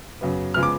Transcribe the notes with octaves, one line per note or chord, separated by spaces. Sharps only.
F#2 C#3 F#3 B3
C#3 F3 G#3 B3 F6
D6